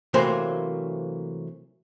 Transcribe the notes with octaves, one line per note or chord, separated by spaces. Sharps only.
C3 E3 F#3 A3 A#3 C5